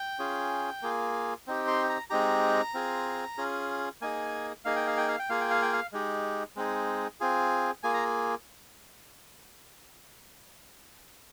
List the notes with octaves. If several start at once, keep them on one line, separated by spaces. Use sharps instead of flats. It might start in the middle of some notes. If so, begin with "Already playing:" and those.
Already playing: G5
C#4 F4 G#4
A#3 F4 G#4
C4 D#4 G4
C6
A#5
G#3 C4 D#4 G4 A#5
C4 F4 G#4
C#4 F4 G#4
A#3 D#4 G#4 G#5
A#3 D#4 G#4 F5
G5
F5
G5
F5
G5
A#3 F4 G#4 F5
G5
F5
G5
F5
G#3 D#4 G4
G#3 C4 D#4 G#4
C4 F4 G#4
A#3 F4 G#4 G#5
A#5